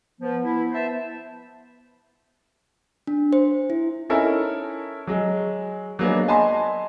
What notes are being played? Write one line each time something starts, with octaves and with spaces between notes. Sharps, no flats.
F3 B3
E4
C5 E5 A5
D4
C5
E4
C#4 D#4 E4 A4 A#4
F#3 G#3
F#3 G#3 A#3 B3 D4
D#5 G#5 A5 B5 C6